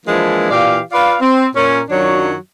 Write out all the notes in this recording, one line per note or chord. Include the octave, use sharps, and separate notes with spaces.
E3 F3 G#3 A#3 D4 E4
A#2 E3 G4 D5 F5
F4 B4 D5 F5
C4
A#2 C#4 A#4
F#2 D#3 F#3 D4 F4 C#5